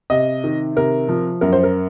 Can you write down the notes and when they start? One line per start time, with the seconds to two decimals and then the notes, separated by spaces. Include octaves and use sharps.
0.10 C3 D#5
0.44 D#3
0.76 C3 A#4
1.09 F3
1.41 F#2 A#4
1.53 C5
1.63 A#4